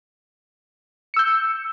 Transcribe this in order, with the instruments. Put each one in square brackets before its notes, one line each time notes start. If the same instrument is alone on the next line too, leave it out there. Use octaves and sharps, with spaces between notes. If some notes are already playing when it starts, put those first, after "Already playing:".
[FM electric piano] C#7
E6
G6